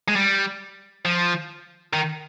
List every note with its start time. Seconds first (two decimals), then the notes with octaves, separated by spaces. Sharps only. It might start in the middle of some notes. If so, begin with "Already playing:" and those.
0.08 G#3
0.16 G3
1.05 F3
1.93 D#3